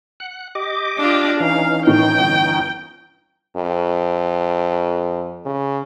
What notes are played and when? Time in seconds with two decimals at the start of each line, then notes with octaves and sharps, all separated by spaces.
0.20 F#5 F#6
0.55 G4 D#5 D6
0.98 D4 F4
1.40 E3 C#4 D#4 F5
1.87 A2 D#3 G5
2.19 G1
3.56 F2
5.46 C#3